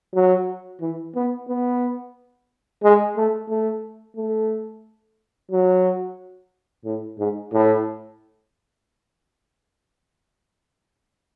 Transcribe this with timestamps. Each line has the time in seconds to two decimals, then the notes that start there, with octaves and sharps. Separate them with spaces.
0.14 F#3
0.81 E3
1.15 B3
1.48 B3
2.83 G#3
3.17 A3
3.49 A3
4.17 A3
5.52 F#3
6.85 A2
7.19 G#2
7.53 A2